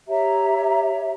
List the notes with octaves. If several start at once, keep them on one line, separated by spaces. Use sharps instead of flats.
G4 C#5 E5 A#5